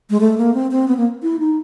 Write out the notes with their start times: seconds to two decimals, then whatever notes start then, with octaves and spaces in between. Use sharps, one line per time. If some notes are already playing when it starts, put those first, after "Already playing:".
0.10 G#3
0.21 A3
0.38 A#3
0.54 C4
0.71 C4
0.88 B3
0.97 A#3
1.23 E4
1.39 D#4